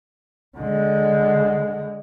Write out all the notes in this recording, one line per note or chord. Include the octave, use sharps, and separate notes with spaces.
D3 G#3